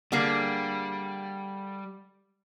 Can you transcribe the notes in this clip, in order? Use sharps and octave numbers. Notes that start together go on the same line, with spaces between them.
D3 G3 A#3 G#4